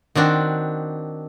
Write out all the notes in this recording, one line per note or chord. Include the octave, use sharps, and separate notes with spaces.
D#3 C4 D4 F#4